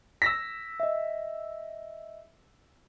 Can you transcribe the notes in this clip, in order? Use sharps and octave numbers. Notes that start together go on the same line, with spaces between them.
E6 A#6 B6
D#5 E5